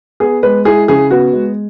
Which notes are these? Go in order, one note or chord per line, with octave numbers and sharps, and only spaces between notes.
B3 G#4
G#3 B4
E4 G#4
C#3 G#4
B3 F#4
G#3